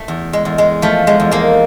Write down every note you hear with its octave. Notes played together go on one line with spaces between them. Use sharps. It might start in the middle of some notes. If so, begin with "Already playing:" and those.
Already playing: A3
E2
G#3
E2
G#3
F3 A3
G#3
E2
G#3 A#3